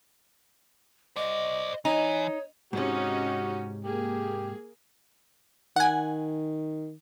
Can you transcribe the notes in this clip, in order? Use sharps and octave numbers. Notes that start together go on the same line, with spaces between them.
C5 D5 D#5
E3 D#4 C#5
G#2 C3 C#4 D#4 F#4 G4
A#3 G4 G#4
D#3 F#5 G#5